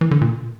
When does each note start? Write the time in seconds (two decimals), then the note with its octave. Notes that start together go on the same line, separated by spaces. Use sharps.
0.01 E3
0.11 D3
0.21 A#2